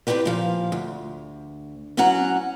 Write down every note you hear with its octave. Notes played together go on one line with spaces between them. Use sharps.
C4 D4 D#4 F#4 G4 B4
A#2 F3 F5
D2
E2 F#3 C#4 F#4 F#5 A#5